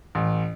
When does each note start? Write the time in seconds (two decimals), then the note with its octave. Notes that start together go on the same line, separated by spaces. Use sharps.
0.15 A1